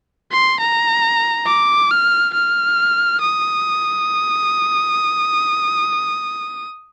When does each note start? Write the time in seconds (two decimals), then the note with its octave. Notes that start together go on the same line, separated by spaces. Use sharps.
0.31 C6
0.60 A#5
1.46 D6
1.91 F6
2.34 F6
3.21 D#6